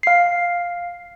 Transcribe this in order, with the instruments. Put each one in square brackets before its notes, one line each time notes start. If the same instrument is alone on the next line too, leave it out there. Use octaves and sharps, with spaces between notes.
[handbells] F5 C7